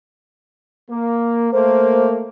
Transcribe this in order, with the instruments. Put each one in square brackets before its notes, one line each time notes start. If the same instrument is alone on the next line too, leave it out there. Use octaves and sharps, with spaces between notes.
[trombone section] A#3
[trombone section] A3 A#3 [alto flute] C5